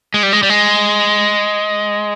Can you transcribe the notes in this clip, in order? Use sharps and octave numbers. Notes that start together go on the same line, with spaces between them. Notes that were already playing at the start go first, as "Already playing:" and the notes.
G#3
G3
G#3
G3
G#3